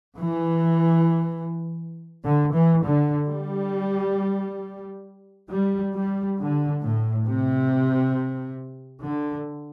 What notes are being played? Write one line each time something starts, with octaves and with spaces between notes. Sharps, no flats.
E3
D3
E3
D3
G3
G3
G3
D3
A2
C3
D3